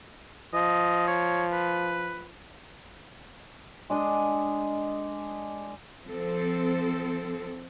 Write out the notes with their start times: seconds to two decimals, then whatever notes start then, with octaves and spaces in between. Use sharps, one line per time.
0.54 F3 D#5
1.08 C#5
1.52 B4
3.90 G#3 D4 D#5
6.04 F3 C4 A4